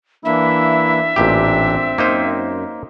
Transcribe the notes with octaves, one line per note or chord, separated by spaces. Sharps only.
E3 A#3 D4 E4 E5
A1 A#2 C4 D4 G4
F#2 A#3 D#4 C5